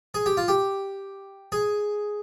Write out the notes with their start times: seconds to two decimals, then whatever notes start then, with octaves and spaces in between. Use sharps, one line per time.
0.14 G#4
0.26 G4
0.37 F4
0.48 G4
1.52 G#4